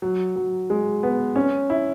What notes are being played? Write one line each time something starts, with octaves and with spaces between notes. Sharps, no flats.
F#3
F#3
G#3
B3
C#4
E4